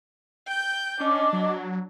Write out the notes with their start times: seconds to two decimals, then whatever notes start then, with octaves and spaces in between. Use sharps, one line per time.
0.46 G5 G6
1.00 C#4 D4 D#5 D6
1.33 F#3